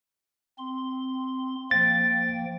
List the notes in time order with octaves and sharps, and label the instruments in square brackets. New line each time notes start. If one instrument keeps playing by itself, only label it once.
[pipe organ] C4 C6
[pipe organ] F3 A#3 G5 [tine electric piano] A6